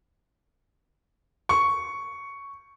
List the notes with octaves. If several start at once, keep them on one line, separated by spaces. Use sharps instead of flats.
C#6